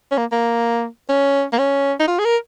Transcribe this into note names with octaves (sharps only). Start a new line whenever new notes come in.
C#4
A#3
A#3
C#4
A#3
C#4
D#4
F4
G#4
A#4